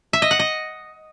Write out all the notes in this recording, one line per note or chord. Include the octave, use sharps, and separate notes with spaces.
E5
D#5
F#5
D#5